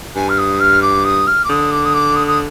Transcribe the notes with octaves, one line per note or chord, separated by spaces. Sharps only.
G2 G#5
F6
D#6
F6
D6
D#6
F6
D6
D3 D#6
D6
D#6
D6
D#6
D#6